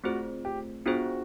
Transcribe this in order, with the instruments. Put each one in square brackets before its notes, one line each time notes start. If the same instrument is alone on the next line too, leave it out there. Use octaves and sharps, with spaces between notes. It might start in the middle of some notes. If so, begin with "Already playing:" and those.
[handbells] A3 C4 F4 G#4 C5 [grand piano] F#4
[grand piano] G4
[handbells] B3 D4 F4 G#4 C5 [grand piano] F#4